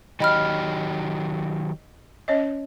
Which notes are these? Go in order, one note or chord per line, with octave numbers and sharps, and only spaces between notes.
D#3 F#3 G4 D#5 B5 F6
C#4 C#5 D#5